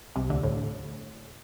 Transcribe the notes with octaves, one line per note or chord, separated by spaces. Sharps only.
C2 C3
D2 D3
A2